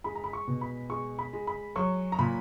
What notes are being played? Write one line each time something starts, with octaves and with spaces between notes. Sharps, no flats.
G#3 B5
A#5
B5
C#6
B2
B5
G#3 C#6
B5
G#3
B5
F#3 C#6
A#5
A#2 B5